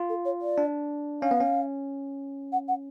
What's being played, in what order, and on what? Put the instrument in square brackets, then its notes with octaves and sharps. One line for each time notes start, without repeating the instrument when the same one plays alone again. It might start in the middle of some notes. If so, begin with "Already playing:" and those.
Already playing: [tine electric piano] F4
[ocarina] A4
C#5
D5
[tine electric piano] D4
[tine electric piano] C#4 [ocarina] F5
[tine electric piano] B3
C#4
[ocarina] F#5
F#5